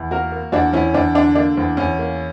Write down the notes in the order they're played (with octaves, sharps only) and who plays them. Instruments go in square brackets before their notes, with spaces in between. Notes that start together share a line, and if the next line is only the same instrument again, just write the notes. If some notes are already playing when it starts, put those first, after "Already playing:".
Already playing: [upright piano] E2
A#3 F#4 A#4
A#3
E2 D4 F#4
E2 C#4 E4
E2 D4
D3 D4
A#3 D4
E2
E2 C#4
A#3